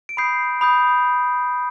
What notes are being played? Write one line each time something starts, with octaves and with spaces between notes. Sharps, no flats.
D7
B5 D#6 G6 C7
B5 D#6 G6